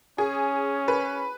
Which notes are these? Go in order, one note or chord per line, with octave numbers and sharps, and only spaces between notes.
C#4 G#4
B4